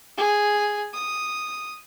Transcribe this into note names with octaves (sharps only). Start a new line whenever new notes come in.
G#4
D#6